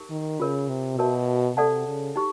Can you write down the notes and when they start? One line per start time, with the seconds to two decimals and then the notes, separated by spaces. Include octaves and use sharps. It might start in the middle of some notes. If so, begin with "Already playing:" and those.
Already playing: D#4 G4 A#4
0.10 D#3
0.40 C#3 F4 A#4 C#5
0.69 C3
0.98 B2 F#4 A#4 C#5 E5 A5
1.56 C3 A4 D5 F#5 A5
1.86 C#3
2.16 D#4 G4